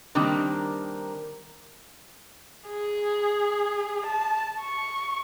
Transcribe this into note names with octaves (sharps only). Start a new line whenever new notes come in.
D#3 G3 A#3 C4 D4 A#4
G#4
A5
C#6